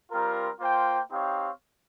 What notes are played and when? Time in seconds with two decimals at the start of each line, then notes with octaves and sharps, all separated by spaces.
0.10 G3 C4 F4 A#4
0.61 A#3 F4 C5 G5
1.10 C4 D#4 G4 C#5 F5